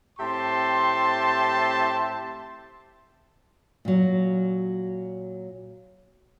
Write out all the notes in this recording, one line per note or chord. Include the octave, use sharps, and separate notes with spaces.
A2 C4 G4 E5 A5 C6
A#2 F#3